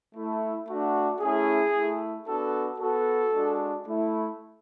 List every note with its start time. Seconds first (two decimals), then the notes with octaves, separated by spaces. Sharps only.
0.16 A3 E4
0.68 A3 D4 F#4
1.21 A3 C#4 E4 G#4
1.75 A3 E4
2.27 B3 D4 F#4 A4
2.80 B3 F#4 A4
3.33 G#3 D4 F#4
3.87 A3 E4